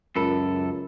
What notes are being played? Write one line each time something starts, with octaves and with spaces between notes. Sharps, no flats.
C#2 F#2 F4 A4 A#4 B5